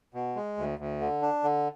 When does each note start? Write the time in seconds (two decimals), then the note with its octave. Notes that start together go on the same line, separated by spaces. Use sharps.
0.14 B2
0.36 G#3
0.57 D2
0.79 D2
1.00 D3
1.22 D4
1.44 D3